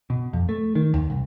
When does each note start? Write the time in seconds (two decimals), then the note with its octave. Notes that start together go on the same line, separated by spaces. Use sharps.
0.10 B2
0.33 F2
0.49 A3
0.75 D#3
0.94 D#2
1.10 C2